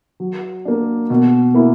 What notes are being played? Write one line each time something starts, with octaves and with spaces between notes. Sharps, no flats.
F#3
A#3 D4
B2
A#3 E4